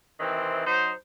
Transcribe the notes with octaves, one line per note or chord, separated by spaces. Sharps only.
C3 D#3 E3 C4
F#3 D#4 C5